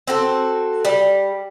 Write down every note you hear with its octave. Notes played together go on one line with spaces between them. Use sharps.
C4 F#4 A4
G3